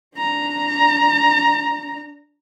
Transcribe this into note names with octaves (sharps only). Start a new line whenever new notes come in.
D4 A#5